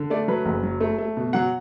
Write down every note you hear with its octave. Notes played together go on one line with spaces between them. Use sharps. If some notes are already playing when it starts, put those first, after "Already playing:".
Already playing: D3
A3 D5
F#3 B4
F#1
F#3
A3
A3
B2
F#3 F#5